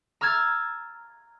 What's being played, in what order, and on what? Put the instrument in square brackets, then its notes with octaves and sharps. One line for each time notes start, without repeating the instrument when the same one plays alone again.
[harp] A#5 E6 F6 G#6 A6